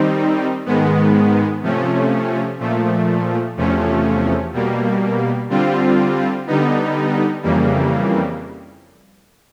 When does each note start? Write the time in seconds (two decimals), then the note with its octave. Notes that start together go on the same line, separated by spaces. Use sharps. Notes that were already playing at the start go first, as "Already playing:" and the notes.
Already playing: D#3 G3 C4 D#4
0.66 G#2 D#3 G#3 B3
1.62 C3 F3 A3 C#4
2.59 A#2 F3 A3
3.57 E2 C3 F3 A3 C#4
4.53 B2 G3 A#3
5.49 D3 G3 C4 F4
6.47 D3 G3 B3 D#4
7.43 F2 C#3 E3 G3 A#3